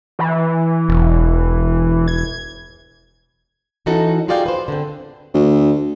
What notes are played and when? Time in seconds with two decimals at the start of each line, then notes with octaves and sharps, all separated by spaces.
0.19 E3
0.89 E1
2.08 G#6
3.86 E3 C#4 D#4 F#4 A4
4.28 F4 F#4 G#4 D5 F5 G5
4.46 B4 C5
4.68 D3 C4
5.34 D2